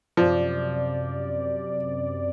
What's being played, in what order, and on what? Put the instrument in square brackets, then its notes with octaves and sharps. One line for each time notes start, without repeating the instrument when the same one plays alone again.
[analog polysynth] F#2 C3 D5 [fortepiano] F3